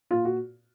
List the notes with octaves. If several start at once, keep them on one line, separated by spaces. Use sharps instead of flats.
A#2 F4
F#4